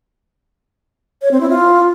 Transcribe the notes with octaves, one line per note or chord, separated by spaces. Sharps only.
C#5
C4
E4
F4